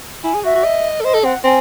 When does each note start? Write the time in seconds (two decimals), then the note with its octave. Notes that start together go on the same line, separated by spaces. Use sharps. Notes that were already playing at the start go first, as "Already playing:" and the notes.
0.24 E4 G#5
0.34 G#4
0.44 F#4 E5
0.55 F#4
0.65 D#5
1.01 A4
1.04 C5 D#5
1.14 A4
1.24 C4 F#5
1.44 C4 G#5